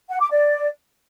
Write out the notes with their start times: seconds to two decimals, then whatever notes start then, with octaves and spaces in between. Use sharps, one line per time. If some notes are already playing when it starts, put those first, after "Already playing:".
0.09 F#5
0.20 D6
0.31 D5